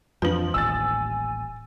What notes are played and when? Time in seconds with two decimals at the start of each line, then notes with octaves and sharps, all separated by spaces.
0.22 F2 E3 F3 D4 B4 F#7
0.54 D#1 A1 D#2 G#5 E6 A6